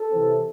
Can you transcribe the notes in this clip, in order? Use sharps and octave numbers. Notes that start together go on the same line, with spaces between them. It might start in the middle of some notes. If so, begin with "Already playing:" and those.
Already playing: A4
C3 E3 C4